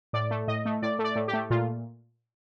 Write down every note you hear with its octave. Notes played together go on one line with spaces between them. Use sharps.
A2 D5
A3
A2 D#5
A3
A2 D5
A3
D5
A2
G4
A3
A#2 F4